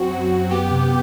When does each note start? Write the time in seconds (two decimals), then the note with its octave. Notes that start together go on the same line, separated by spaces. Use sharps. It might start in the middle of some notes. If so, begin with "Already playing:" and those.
Already playing: F#2 C4 F#4
0.11 F#3
0.30 F#2
0.51 B3 G4
0.71 C3